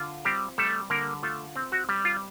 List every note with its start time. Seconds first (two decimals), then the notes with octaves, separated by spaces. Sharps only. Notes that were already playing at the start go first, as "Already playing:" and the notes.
Already playing: D3 F4
0.25 G3 C4 G4
0.58 G3 A3 A4
0.90 D3 A#3 A#4
1.23 A3 F4 A4
1.56 C4
1.72 F#4
1.89 G3
2.05 F4